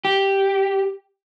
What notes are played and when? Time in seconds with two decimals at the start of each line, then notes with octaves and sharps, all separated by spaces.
0.05 G4